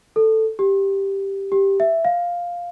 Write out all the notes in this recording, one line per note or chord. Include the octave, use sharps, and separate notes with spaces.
A4
G4
G4
E5
F5